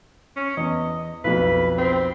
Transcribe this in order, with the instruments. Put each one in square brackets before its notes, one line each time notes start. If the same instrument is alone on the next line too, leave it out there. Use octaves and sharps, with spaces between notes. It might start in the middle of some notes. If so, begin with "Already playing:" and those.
[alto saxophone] C#4
[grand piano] E2 [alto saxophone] D#5
[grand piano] B1 F2 [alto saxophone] B4
[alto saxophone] C4